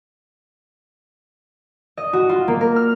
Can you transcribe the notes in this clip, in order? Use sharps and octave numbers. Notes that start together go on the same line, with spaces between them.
D#5
F#4
F4
A#3
A#4
F6